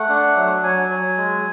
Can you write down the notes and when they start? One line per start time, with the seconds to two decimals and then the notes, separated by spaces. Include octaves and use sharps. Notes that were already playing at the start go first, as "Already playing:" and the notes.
Already playing: A3 F#5
0.09 D4
0.36 F#3
0.63 F#3 G#5
0.90 F#3
1.17 G#3